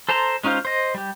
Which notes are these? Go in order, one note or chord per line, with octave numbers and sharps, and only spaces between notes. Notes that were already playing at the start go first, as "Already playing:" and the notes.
A4 C5 A5 A#5 C6
G#3 C#4 D#4 F4 C5
C5 D#5
G3 G4